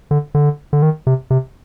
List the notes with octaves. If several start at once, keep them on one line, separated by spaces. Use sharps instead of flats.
D3
D3
D3
D#3
C3
C3